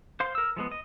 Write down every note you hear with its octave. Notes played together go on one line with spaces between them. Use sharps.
C5 F5 C6
A#4 E6
F3 G#3 B3
D#5